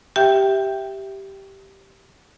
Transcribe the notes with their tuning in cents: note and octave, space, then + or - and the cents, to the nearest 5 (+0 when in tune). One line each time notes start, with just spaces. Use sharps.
G4 -10 E5 +0 G5 +0